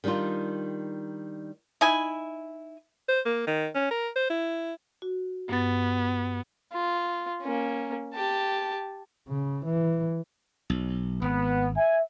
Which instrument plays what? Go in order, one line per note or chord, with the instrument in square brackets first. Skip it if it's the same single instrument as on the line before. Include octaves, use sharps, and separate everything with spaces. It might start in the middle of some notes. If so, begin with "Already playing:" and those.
[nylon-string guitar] D#3 G3 D4 D#4 F4
[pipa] D#4 E4 G#5
[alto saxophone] C5
A#3
D#3
C#4
A#4
C5
E4
[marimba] F#4
[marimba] G2 A6 [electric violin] B3
[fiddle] F4
A#3 C#4
G4 A5
[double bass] C#3
E3
[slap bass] B1
[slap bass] G#1 [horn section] B3
[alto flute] E5 [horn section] G#5